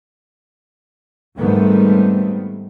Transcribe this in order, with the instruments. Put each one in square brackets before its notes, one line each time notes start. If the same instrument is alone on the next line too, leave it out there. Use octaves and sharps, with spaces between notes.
[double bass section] G#2 D#3 G3 A3 B3 C4